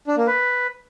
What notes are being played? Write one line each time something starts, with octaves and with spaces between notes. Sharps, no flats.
D4
A#3
B4